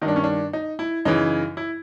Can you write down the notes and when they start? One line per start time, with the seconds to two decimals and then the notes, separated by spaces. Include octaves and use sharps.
0.02 G2 D#3 D#4
0.08 D4
0.16 C#4
0.24 D4
0.53 D#4
0.79 E4
1.05 F#2 C#3 E3 D#4
1.57 E4